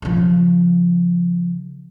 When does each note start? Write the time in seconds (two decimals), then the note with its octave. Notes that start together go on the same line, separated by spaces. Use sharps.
0.02 C#3 F3